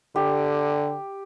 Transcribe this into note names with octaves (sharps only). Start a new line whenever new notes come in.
D3 G4